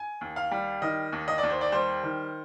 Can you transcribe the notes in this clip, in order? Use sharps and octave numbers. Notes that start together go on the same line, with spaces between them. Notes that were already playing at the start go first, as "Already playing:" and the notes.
Already playing: G#5
D#2
F5
G3
D#3 D#5
D#2
D#5
D5
D#2
C5
D5
G3 C5
D#3